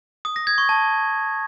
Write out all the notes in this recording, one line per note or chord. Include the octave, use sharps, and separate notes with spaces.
D#6
A#6
G#6
C#6
A5